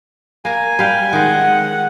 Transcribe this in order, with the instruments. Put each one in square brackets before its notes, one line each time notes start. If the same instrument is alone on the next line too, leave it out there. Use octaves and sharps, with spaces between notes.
[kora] A#3 A#4 [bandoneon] G#5
[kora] G3 F5 G5
[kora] D#3 G#3 [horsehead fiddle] F#5